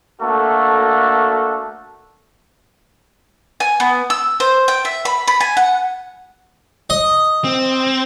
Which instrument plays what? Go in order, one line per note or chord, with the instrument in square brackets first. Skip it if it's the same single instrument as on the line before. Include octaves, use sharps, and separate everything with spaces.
[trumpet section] A3 A#3 D4 F#4 A4
[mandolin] G#5
B3
E6
C5
G5
E5
B5
B5
G#5
F#5
[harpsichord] D#5
[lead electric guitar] C4